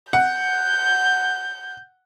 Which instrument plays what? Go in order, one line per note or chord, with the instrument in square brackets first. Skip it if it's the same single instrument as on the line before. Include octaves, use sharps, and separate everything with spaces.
[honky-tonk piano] F#5 [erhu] G6